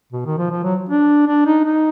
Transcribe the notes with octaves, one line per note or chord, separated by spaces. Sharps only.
B2
D#3
F3
F3
F#3
D4
D4
D#4
D#4